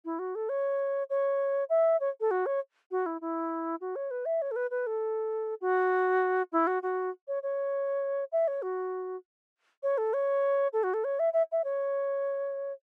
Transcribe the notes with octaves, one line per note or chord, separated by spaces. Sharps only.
E4
F#4
A4
C#5
C#5
E5
C#5
A4
F#4
C#5
F#4
E4
E4
F#4
C#5
B4
E5
C#5
A4
B4
B4
A4
F#4
E4
F#4
F#4
C#5
C#5
E5
C#5
F#4
C#5
A4
C#5
A4
F#4
A4
C#5
E5
E5
E5
C#5